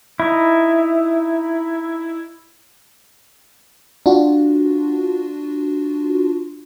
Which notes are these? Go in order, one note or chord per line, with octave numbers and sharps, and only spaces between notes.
D#4 E4
D4 F4 F#4